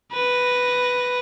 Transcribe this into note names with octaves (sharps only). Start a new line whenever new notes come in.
B4 A#6